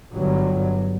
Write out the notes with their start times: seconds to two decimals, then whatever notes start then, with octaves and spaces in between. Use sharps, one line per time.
0.13 G1 G2 F#3